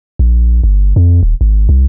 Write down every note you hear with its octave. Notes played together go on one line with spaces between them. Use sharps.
A#1
G1
F2
D#1
G#1
C2